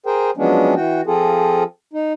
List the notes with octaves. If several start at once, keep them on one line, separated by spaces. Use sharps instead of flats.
G#4 A#4 C5 G5
F3 F#3 G#3 B3 C#4 D4
E3 F#4 G5
F3 C4 F4 G#4 A4
D#4